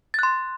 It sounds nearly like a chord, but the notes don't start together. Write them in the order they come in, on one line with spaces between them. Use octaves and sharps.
A6 F#6 C6